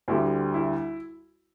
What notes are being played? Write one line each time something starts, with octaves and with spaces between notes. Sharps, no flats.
D2 D3 G3 E4
E4